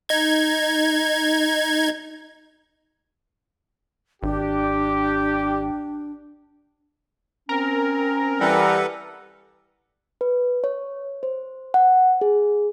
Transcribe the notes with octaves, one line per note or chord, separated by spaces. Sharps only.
D#4 G#6
G#1 D4 G4
C4 C#4 A#4
E3 G3 A4 B4 F#5
B4
C#5
C5
F#5
G#4